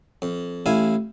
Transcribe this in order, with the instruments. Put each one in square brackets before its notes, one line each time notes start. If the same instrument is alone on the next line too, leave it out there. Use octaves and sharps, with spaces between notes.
[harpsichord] F2
A1 E4 F5 G#5